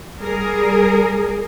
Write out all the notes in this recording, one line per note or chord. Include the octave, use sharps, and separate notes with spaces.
G3 G#4 A#4